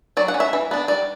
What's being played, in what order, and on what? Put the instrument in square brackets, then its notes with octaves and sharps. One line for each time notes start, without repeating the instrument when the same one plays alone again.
[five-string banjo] F#3 D5
F#5
C#4
E5
E3
B3 D4
G3 D5